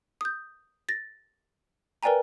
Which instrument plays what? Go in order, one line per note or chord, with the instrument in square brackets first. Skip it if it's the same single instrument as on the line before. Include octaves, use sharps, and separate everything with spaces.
[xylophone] D#6 G6
A6 A#6
A#4 B4 D5 G5 G#5 A#5